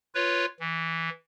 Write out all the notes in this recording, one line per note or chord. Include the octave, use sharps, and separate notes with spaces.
F4 B4 C#5
E3